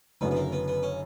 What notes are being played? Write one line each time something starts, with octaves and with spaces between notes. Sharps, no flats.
F#1 F#2 D3 B3
B3
A#3
B3
B3
C#4